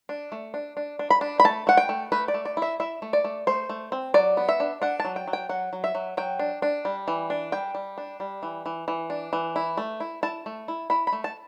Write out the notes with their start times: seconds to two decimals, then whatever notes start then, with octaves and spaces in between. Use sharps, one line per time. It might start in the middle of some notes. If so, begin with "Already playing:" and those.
0.09 D4
0.32 A3
0.54 D4
0.77 D4
0.99 D4
1.10 B5
1.21 D4
1.40 B5
1.44 A3 A5
1.67 A3 F#5
1.77 G5
1.89 A3
2.12 A3 B4
2.28 D5
2.34 A3
2.45 D5
2.57 E4
2.62 E5
2.80 E4 E5
3.02 A3
3.13 D5
3.24 A3
3.47 A3 C5
3.69 A3
3.92 C4
4.14 F#3 D5
4.37 B3
4.49 E5
4.60 D4
4.82 D4 F#5
5.00 F#3 A5
5.16 G5
5.27 F#3
5.33 G5
5.49 F#3 F#5
5.73 F#3
5.84 E5
5.95 F#3
6.17 F#3 G5
6.39 D4
6.62 D4
6.85 G3
7.08 E3
7.30 D4
7.52 G3 G5
7.75 G3
7.98 D4
8.20 G3
8.43 E3
8.66 E3
8.88 E3
9.10 D4
9.33 E3
9.56 E4
9.77 A3
10.00 E4
10.23 E4 A5
10.46 A3
10.68 E4
10.90 E4 B5
11.07 B5
11.12 A3
11.24 A5